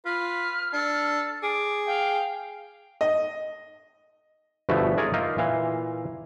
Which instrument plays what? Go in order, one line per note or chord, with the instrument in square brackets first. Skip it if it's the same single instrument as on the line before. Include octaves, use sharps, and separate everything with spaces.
[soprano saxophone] F4 [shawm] B4 [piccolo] F6
[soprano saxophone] D4 [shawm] A4
[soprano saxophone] G#4 [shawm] D6
[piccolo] F5 [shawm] G5
[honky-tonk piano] D#5
[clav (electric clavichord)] G1 B2 E3 F3 A3 E5
G#3 G#4 A#4 C#5 D5 G#5
A#3 D#4 F4 A#4 E5 F5
A#2 E3 A#3 F5